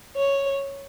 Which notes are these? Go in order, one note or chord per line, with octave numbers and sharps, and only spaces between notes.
C#5